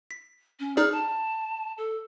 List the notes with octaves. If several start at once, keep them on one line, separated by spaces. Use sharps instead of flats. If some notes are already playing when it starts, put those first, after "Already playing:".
B6
C#4
D#4 G#4 D5 F6
A5
A4